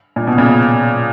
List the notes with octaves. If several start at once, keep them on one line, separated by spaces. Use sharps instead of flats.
A#2
B2
A#2 C#3